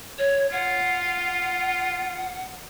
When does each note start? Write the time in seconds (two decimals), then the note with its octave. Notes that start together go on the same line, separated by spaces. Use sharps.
0.19 C#5
0.52 F4 F#5